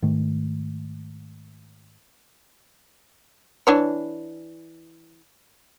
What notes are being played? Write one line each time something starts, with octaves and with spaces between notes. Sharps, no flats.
G#2 D#3 A3
E3 D4 C#5